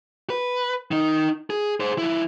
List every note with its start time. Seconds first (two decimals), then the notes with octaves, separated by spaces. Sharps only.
0.30 B4
0.91 D#3 D#4
1.50 G#4
1.80 G#4 C5
1.98 F3 E4